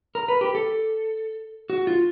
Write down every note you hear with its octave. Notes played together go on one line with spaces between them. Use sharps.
A#4
B4
G4
A4
F#4
F4